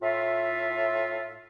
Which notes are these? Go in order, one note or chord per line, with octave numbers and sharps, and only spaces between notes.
A2 F4 E5